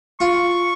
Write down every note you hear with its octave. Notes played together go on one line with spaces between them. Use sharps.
F4 C#6